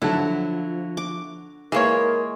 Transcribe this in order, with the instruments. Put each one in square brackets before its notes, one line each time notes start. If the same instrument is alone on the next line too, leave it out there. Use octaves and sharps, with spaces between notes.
[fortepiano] D3 F#3 A5 [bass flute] F3 [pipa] E4
[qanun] D6
[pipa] E3 F4 C#5 [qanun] G#3 A#3 [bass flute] A#4